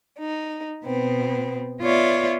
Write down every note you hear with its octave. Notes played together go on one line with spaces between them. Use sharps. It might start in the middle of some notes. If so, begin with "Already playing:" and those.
D#4
B2 B3 C4
B3 F4 C#5 D5 E5